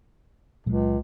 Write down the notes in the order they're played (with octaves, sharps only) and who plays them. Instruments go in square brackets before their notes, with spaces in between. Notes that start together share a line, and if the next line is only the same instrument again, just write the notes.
[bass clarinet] C#2 [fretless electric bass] A#2 F#3 G#3